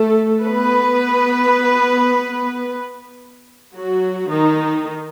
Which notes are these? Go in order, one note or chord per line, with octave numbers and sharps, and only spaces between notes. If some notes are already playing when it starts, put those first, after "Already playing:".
Already playing: A3 A4
B3 B4
F#3 F#4
D#3 D#4